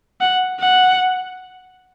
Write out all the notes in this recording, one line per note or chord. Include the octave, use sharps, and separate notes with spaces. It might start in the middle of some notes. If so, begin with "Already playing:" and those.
F#5
F#5